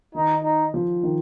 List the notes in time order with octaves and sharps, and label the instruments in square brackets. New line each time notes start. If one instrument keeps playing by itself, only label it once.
[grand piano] D#3 [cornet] D#4
[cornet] D#4
[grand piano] F3
D#3